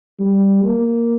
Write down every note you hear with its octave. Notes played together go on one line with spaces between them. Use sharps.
G3
A#3